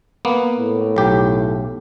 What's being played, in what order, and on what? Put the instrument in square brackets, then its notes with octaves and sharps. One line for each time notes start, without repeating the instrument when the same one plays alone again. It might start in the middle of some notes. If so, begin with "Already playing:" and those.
[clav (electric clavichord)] A#3 B3
[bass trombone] A2
[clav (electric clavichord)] B1 G4